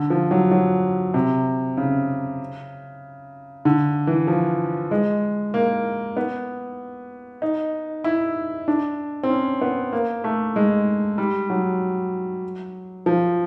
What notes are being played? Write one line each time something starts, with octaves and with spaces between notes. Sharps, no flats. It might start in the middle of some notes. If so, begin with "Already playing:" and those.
Already playing: D3
F3
F#3
F#3
C3
C#3
D3
E3
F3
G#3
A#3
B3
D#4
E4
D4
C4
C#4
B3
A#3
A3
G#3
G3
F#3
F3